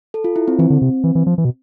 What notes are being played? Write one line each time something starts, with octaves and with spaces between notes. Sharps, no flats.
A4
F4
E4
C4
E3 C4
D3
C3
E3
E3
F3
E3
B2